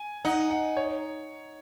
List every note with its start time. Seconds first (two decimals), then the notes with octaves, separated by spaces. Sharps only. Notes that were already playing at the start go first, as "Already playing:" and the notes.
Already playing: G#5
0.25 D#4 F#5
0.51 F#5
0.77 C#5